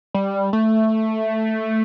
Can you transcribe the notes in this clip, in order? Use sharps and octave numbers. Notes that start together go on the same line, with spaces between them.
G3
A3